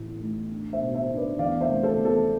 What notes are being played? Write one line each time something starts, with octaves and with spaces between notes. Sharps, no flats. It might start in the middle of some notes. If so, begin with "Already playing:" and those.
Already playing: A1 A2
A1
D4
C5 E5
B2
C5 E5
D4
B4 D5
E2 D5 F5
C5 E5
F1
A4 C5
E2
A4